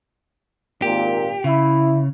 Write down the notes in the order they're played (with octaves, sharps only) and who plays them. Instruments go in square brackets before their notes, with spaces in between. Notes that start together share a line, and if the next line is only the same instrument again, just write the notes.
[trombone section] G#1 A#2 [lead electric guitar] G4
[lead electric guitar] C#3 [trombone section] E4